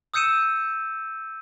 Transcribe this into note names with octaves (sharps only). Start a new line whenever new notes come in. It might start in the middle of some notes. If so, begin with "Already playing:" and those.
D#6 E6 G6 C#7 D#7 E7